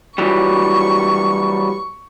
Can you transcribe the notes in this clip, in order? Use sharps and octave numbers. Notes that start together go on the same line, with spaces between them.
E3 F#3 G3 C#6